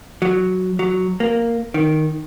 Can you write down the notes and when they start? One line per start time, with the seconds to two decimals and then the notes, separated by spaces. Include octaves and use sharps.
0.22 F#3
0.79 F#3
1.20 A#3
1.74 D#3